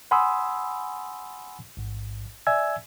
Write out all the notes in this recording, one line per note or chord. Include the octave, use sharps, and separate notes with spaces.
F#5 G#5 B5 C6 D#6 E6
A1 G#2
D5 E5 G#5 E6 G#6